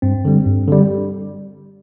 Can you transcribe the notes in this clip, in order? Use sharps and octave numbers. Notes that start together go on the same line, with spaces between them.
G2 C4
D3 G3
G2
D3 G3